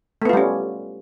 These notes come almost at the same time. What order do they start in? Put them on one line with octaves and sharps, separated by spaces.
A3 B3 F4 G3 C#4